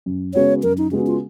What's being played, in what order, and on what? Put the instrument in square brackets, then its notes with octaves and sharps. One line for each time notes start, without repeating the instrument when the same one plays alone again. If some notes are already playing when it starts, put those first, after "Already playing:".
[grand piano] F#2
[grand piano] C#3 G#3 B3 F#4 [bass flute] C#5
[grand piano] F#2 [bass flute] A#4
[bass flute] D#4
[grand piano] C#3 G#3 B3 F#4 [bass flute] C#4
[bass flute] F4